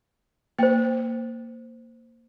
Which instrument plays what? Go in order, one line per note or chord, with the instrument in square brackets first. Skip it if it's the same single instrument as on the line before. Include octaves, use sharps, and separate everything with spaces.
[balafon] A#3 [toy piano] C5 G5